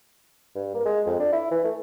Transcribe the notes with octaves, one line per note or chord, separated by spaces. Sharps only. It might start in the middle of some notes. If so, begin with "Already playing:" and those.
G2
A#3
G#3
F2
D4
E4
E3
A3